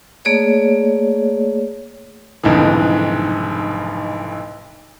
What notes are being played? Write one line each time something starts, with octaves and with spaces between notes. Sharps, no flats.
A3 A#3 G#4 C#5 D5
F1 B1 G#2 D3 E3